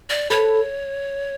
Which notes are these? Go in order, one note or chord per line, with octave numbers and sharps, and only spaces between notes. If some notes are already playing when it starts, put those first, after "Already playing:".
D5
A4 B4 C#5